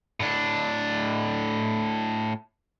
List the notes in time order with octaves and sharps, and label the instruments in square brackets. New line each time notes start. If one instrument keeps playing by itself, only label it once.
[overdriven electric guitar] A2 D4